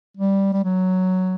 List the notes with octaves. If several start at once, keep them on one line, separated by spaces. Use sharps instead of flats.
G3
G3
F#3